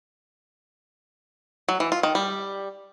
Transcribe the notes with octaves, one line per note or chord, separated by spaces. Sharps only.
F#3
E3
F4
D#3
G3